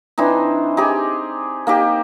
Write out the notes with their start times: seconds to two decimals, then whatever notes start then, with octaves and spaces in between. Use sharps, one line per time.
0.18 E3 C4 D4 D#4
0.77 D#4 G4 G#4
1.67 A#3 D#4 G4